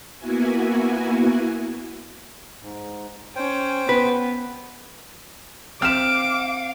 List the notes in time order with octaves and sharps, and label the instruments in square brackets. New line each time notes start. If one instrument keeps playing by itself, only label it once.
[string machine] A#3 B3 E4 F#4 G#5
[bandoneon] G#2
[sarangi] C#4 [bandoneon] C5 G5
[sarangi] B3 [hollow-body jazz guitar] B4
[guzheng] C4 C5 E5 [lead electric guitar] F5 [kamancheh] D6 [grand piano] F6 E7